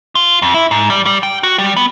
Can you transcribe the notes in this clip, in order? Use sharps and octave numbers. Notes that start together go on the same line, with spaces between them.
F4
F2
E4
G#2
G3
G3
G5
F#4
G3
B3